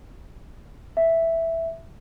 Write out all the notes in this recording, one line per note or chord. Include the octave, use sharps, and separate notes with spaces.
E5